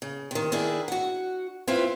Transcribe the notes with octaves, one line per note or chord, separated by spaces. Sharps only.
C#3
C3 D#3
D#3 D4 E4 G#4
F#4 F#5
C4 E4 F4 B4 E5 F5